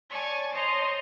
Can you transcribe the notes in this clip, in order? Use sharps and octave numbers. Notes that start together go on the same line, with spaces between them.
C#5 D5 G#5 A5 C#6
C5 C#5 D#5 A5 A#5 C6